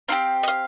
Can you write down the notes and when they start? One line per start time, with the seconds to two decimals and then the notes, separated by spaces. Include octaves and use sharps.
0.09 C4 D#4 G4 F5
0.43 D#5
0.48 F5